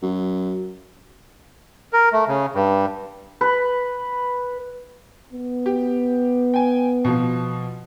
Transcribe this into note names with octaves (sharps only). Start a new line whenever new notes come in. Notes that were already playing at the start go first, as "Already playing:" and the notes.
F#2
A#4
A3
C#3
G2
B4
B3
G4
G5 G#5
B2 F3